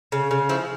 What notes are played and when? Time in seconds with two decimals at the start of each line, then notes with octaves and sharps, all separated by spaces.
0.12 C#3
0.31 C#3
0.49 F3 E4